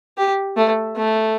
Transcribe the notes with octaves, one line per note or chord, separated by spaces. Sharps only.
G4
A3
A3